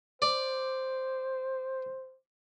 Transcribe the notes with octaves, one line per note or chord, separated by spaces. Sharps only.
C5 D5